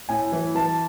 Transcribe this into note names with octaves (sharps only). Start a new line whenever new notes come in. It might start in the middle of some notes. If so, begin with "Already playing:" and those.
A2 G#5
E3
E3 A5